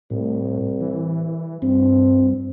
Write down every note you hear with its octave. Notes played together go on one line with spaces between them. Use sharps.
C2 A2
E3
G2 C4